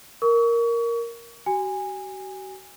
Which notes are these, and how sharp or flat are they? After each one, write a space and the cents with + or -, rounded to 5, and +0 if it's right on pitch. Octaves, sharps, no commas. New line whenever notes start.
A#4 +0 C#6 +35
F#4 +40 G#5 -20